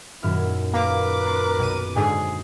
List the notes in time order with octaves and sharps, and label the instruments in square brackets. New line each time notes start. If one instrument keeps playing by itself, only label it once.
[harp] D#1 F#2 F6 [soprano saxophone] E4
[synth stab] A#3 [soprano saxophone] A#4 [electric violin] B4 D6
[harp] A#5 C6 A6
[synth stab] B1 D#7
[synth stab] G#2 D3 [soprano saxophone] G#4